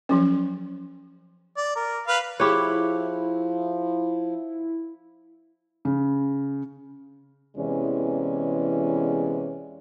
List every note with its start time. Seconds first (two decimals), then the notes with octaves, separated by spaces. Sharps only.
0.09 F3 F#3 C#4
1.56 D5
1.76 A#4
2.08 B4 F5
2.40 F3 E4 G4 G#4 C#5 B5 F#6
5.85 C#3
7.56 E2 C3 E3 G#3 C#4 D5